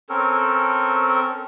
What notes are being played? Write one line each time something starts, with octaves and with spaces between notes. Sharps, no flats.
C4 C#4 A4 A#4